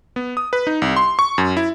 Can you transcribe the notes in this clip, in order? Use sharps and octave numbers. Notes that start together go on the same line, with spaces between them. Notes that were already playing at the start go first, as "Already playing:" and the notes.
B3
D#6
B4
D#4
C2
C6
C#6
F#2
E4